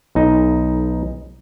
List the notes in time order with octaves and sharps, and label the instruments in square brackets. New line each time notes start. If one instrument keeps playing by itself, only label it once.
[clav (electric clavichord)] B1 D#4